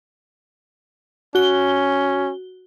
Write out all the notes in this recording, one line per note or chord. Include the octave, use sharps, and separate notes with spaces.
C#4 F#4 G7